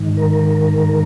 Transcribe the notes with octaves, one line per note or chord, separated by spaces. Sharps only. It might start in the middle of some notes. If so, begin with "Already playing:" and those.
Already playing: G#2 D#3
A#4